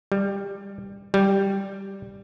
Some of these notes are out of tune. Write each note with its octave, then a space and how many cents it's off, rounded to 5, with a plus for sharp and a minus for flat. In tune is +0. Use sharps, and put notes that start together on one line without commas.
G3 +15
G3 +0